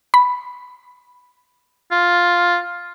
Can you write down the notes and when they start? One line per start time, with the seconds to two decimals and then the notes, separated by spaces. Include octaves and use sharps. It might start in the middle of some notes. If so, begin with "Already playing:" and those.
0.14 B5
1.92 F4